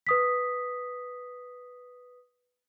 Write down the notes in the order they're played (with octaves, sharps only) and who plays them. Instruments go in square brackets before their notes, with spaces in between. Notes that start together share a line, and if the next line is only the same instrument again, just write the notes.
[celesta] B4 D#6 B6